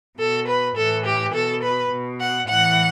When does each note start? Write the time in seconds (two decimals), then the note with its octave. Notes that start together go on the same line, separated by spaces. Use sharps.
0.19 B2 A4
0.47 B4
0.76 A2 E3 A4
1.06 G4
1.33 B2 A4
1.62 B4
1.92 B2
2.20 F#5
2.48 A2 E3 F#5